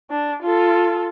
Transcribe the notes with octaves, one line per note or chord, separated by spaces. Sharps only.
D4
F4 A4